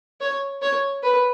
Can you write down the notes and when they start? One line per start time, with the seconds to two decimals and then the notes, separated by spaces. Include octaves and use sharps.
0.21 C#5
0.62 C#5
1.03 B4